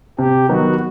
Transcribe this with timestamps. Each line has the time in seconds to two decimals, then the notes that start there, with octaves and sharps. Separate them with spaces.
0.19 C3 G4
0.49 D#3 F#3 B3 D#4 F#4